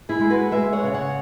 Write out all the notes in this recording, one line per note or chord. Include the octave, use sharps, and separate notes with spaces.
E4 G#4
G#3
F#4 B4
G#3 B4 E5
C#5 F#5
C#3
C#5 F#5